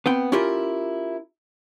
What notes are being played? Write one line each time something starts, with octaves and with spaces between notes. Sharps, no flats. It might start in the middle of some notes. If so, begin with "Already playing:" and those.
B3 C4 G5
C#4 E4 F4 G4 A#4